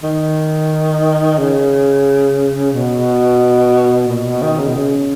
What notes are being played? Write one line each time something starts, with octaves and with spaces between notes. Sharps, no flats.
D#3
C#3
B2
A#2
B2
D#3
C#3
B2
C#3